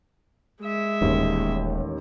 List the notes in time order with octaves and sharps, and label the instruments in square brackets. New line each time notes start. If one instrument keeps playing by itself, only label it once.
[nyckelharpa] G#3 E5
[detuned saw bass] D#1 [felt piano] A1 D#2